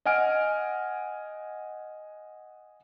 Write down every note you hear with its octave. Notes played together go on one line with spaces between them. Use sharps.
D#5 F#5 G#5 F6 D7